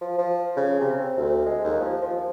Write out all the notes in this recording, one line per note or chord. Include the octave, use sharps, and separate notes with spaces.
F3
F3
C#3
C3
C4
D2
G#3
D#2
F3
F3